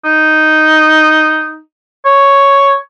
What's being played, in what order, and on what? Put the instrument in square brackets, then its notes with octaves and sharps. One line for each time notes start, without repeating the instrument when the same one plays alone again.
[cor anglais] D#4
C#5